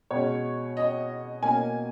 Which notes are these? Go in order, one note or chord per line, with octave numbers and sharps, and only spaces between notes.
B2 G#3 C#4 C#5
D#5
B2 A#3 C#4 G#5